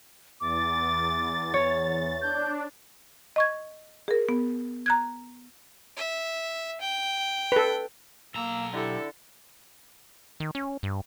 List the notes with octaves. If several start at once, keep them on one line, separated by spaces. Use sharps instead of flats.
E2 D6 A6
C#5
D4 G6
D#5 C#6 G#6
G#4 A#4
B3
A#5 F#6 G#6
E5
G5
A4 B4
B1 A#3 A#5 E6
D3 E4 G4 A4
D#3
C#4
G2